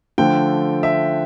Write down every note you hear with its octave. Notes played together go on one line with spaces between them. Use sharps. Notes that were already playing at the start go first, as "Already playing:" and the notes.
D3 F3 A3 G5
E5